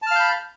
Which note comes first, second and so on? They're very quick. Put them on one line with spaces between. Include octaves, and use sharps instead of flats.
A5 F6 F5 G6 B5